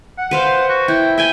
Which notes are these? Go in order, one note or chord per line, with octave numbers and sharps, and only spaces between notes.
F#5
B4 C5 F5
F#4
E4 G5
E5 G5 G#5